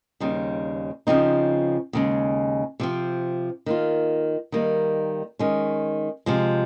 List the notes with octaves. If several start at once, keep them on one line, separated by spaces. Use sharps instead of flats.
D#2 C#3 G3 C4 D#4
C#3 F3 C4 D#4
D#2 C#3 G#3
C3 F3 C4
D#3 A#3 F4
D#3 G3 A#3 D#4
D#3 G#3 C#4
C3 F3 G#3